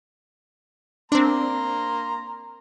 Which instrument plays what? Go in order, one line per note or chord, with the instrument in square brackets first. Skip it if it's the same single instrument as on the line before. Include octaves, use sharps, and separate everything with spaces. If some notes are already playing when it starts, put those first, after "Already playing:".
[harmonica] A#3 A#5 C6 [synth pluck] C4 D4